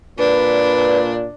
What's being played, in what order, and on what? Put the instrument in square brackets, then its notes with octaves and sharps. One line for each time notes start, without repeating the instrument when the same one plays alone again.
[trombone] A#2 [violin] D4 [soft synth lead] B4